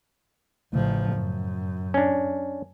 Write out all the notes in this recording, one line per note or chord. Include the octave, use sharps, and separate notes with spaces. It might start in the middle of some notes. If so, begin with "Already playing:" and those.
A1 A2 C#3 F3 A3
F#2
C#4 D4